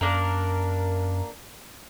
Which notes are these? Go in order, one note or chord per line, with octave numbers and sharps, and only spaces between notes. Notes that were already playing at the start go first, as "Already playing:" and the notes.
F#2 A#3 D4 A#4